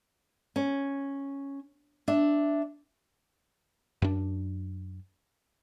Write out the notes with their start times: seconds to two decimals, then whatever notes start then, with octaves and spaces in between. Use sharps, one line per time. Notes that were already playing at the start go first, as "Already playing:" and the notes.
0.56 C#4
2.08 D4 E5
4.02 F#2 D4